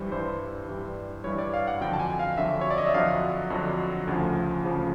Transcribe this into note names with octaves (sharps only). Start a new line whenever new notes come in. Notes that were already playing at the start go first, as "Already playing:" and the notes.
Already playing: G2 E3 G3 C5
G2 E3 G3 C5
G2 E3 G3
G2 E3 G3 C#5
D5
F5
F#5
F2 D3 F#3 G5
A5
G#5
F5
F2 D3 F#3 E5
C#5
D5
D#5
E5
F2 D3 F#3 F5
F2 D3 F#3
D2 C#3 F3
D2 C#3 F3